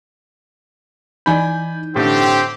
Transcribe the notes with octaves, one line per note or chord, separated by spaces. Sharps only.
E3 D#4 D5 G#5 B5 G6
A2 D3 C4 G4